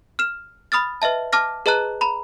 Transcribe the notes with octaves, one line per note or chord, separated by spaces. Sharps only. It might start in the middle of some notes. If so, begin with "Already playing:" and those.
F6 E7
B5 D#6 F6 A6
B4 D#5 E5 A5
A5 D6 F6 A#6
G#4 B4 D#5 A5 A#5 F#6
A#5 B5